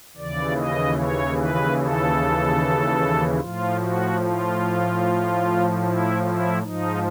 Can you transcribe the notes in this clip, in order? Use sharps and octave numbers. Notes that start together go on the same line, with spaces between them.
D#2 C#3 E3 D5
D#5
C#5
B4
A4
A2 F3 F4
F#4
F4
E4
E4
G#2 F3 D#4